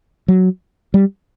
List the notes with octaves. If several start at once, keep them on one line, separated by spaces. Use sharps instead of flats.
F#3
G3